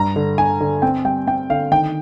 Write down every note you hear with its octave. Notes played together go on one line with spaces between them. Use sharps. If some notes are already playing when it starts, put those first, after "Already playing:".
Already playing: G2 A#5
D3
D3 G#5
D3
C4 G5
G3 G5
C4 G5
D3 F5
D#3 G5